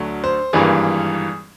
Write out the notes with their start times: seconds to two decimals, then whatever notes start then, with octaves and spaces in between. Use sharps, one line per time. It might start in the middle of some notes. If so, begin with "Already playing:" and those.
Already playing: D2 D3 F#3 A3
0.24 C5
0.53 G#1 G2 E3 G3 A#3 G#4